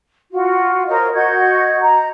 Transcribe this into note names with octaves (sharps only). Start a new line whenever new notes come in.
F4 F#4
A#4 C5 C#5 D#5
F#4 D#5 G6 G#6
A#5